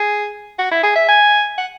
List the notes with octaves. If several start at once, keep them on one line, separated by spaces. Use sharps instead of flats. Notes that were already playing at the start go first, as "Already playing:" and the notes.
Already playing: G#4
F#4
E4
G#4
E5
G#5
F#5